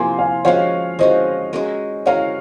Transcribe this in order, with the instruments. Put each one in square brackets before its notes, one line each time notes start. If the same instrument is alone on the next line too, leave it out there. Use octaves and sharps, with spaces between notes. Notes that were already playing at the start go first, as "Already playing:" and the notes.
Already playing: [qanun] C3 F3 A#3 [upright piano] G#5 C6
[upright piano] F5 G#5
[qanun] F3 G#3 C#4 F#4 [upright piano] C#5 F5
[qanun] F3 G#3 C#4 F#4 [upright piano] C5 D#5
[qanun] G#3 C#4 F#4 A#4
[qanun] G#3 C#4 F#4 A#4 [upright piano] C#5 F5